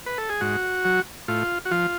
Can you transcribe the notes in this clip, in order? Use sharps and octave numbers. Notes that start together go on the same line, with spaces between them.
B4
A4
G#4
G#2 F#4
F#3
A2 F4
F#4
F3 F4